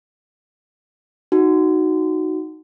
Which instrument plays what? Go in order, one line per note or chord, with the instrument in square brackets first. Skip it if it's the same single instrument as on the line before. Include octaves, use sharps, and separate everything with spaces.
[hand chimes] D#4 F#4